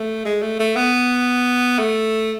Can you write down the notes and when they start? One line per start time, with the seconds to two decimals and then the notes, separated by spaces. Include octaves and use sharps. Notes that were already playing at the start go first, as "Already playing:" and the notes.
Already playing: A3
0.25 G#3
0.42 A3
0.59 A3
0.76 B3
1.79 A3